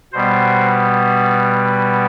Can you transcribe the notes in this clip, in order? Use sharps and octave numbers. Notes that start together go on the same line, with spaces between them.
B2 G3 B3 C5